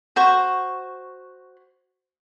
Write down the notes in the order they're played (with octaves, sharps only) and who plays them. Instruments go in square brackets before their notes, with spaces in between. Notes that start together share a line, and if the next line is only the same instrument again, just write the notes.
[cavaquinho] F#4 C5 C#6